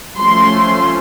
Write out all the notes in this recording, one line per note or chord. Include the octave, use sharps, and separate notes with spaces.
F3 A3 C#4 C6